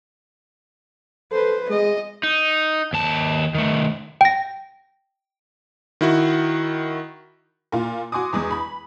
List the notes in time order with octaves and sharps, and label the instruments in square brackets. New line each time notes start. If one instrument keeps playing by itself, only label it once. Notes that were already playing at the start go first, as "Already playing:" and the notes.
[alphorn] A4 [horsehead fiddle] B4 C5
[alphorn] G#3 [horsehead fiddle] D#5
[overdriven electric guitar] D#4
D#2 A5
D#3 A3
[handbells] G5 A#6
[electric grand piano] D#3 E4 F#4
[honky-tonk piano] A#2 F4
F#4 G#5 C6 D6 D#6
E2 G#3 D#6
B5